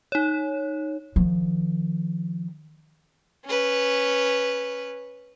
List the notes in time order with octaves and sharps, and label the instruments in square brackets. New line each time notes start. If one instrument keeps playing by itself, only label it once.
[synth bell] D#4 C#5
[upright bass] D#3 F3
[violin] C#4 B4